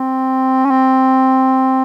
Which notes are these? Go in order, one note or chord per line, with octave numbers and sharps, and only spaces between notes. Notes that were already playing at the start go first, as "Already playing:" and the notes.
Already playing: C4
C#4
C4